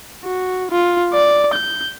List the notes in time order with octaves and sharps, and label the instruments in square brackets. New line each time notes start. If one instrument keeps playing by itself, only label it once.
[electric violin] F#4
F4
D5
G6